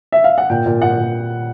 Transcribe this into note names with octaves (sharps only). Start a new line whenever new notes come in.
E5
F5
F#5
A#2 G5
A#2
A#2 F#5
A#2